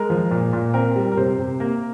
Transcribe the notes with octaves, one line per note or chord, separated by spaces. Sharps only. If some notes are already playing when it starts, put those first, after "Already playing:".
Already playing: G#3 A#4
F3
A#2
A#2
C4 A#4
G3
A#4
C3 C5
C3
A#3 A#4